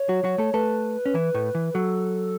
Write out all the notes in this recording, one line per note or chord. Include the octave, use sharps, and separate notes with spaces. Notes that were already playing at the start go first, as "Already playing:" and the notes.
Already playing: C#5
F#3 F#4
F#3 F#4
A3 A4
A3 A4 B4
C#4
E3 E4
A2 A3
E3
F#3 A4